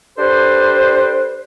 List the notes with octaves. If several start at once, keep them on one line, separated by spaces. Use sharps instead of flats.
D4 G4 A4 B4 C5